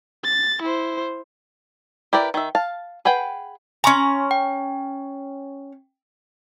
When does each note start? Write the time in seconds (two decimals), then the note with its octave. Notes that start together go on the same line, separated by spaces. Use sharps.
0.24 A6
0.62 E4 C5
2.13 E4 G4 A#4 B4 D5
2.34 D#3 E5
2.55 F5 A5
3.05 G#4 B4 F#5 G5
3.84 C#4 G#5 A#5 C6 C#6
4.31 G5